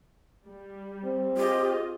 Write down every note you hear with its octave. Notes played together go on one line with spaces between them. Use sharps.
G3
C4
F4 G4 G#4 D#5